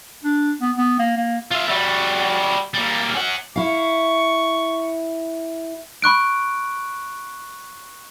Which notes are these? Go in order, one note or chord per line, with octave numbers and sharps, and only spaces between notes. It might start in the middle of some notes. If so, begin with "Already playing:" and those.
D4
B3
B3
A#3
A#3
F4 E5
G3 F#4
G3 A#3
C#4 F#5
E4 F5 C#6
B5 C#6 F#6 D7